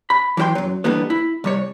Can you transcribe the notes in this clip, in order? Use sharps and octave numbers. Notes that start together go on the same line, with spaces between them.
B5
E3 F#3 E4 G5 C6
F#2 F#3
B2 D3 E3 G3 A#3 B3
E4
C2 G3 C#5